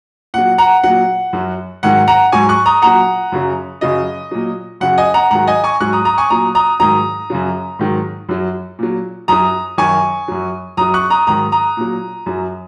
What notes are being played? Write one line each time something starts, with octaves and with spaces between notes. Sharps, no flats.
A#2 F#3 F#5
F#5 A#5
A#2 F#3 F#5
F#2 F#3
G#2 D#3 F#3 F#5
F#5 A#5
G#2 F#3 G#5 C#6
C#6 F#6
A#5 D#6
A#2 F#3 F#5 A#5
F#2 C#3 F#3
F#2 C#3 F#3 D#5
A#2 F#3
F#2 C#3 F#3 F#5
D#5 G#5
F#5 A#5
G#2 D#3 F#3 F#5 A#5
D#5 G#5
G#5 C#6
G#2 F#3 C#6 F#6
A#5 D#6
A#5 D#6
G#5 C#6
A#2 F#3 A#5 D#6
A#5 D#6
G#2 D#3 F#3 A#5 D#6
F#2 C#3 F#3
G#2 D#3 F#3
F#2 F#3
A#2 F#3
F#2 F#3 A#5 D#6
F#2 D#3 F#3 G#5 C#6
F#2 F#3
F#2 F#3 A#5 D#6
C#6 F#6
A#5 D#6
G#2 D#3 F#3 A#5 D#6
A#5 D#6
A#2 F#3
F#2 F#3